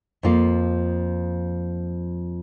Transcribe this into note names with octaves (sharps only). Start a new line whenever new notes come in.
F2 F3 A#3 F4